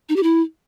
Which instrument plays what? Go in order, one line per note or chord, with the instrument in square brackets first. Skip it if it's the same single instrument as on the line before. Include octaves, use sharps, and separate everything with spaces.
[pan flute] D#4
G4
E4